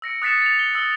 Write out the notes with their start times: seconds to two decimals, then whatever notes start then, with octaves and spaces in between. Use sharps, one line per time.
0.02 E6 A#6 C#7 D7
0.22 D#6 F#6 A6 B6 C#7 E7
0.42 A6 F7
0.59 G7
0.74 D#6 E6 G7